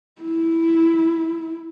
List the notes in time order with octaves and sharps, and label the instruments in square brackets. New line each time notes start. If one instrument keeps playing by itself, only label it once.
[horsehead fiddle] E4